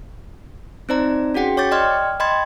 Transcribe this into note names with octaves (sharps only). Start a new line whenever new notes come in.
C4 D#4 C5 D5 A#5
C#4 F#4 G#4 F#5 G5 B6
C#5 C#6 D6 G6 A6
D5 D#5 G5 C6 F6 G#6
D#5 G5 B5 C6 G#6 A6